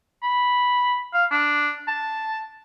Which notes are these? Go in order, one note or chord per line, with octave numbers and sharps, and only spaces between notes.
B5
F5
D4
A5